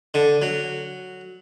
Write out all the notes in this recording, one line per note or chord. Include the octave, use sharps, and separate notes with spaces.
D3
F#3